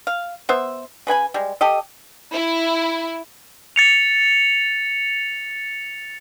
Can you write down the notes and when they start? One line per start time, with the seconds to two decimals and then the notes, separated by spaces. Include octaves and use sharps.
0.07 F5
0.49 B3 C5 E5
1.07 C#3 B4 G#5 B5
1.34 G3 G#3
1.61 G4 A4 D#5
2.33 E4
3.76 A6 C#7 F7